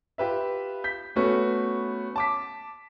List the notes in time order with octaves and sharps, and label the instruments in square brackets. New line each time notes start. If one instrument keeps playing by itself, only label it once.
[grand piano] F4 G4 B4 E5
G6 B6
A3 B3 C#4 F#4 A4 B4
A5 D6 B6